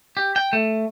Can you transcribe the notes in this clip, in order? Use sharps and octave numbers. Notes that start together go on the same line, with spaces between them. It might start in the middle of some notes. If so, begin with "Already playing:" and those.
G4
G5
A3